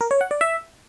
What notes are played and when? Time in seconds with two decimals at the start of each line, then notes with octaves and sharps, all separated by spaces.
0.01 A#4
0.11 C#5
0.21 F#5
0.31 D5
0.41 E5